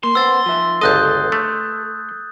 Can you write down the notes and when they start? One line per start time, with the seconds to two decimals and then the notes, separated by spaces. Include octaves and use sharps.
0.04 A#3 C6
0.15 B3 C5 E6 A6
0.46 F3 E5
0.81 G1 C#2 A4 D#5 D#6 F#6 G6
1.32 A3